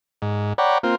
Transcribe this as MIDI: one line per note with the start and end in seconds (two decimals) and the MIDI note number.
0.22 0.53 44
0.58 0.78 73
0.58 0.78 74
0.58 0.78 78
0.58 0.78 79
0.58 0.78 82
0.58 0.78 83
0.83 0.95 58
0.83 0.95 60
0.83 0.95 65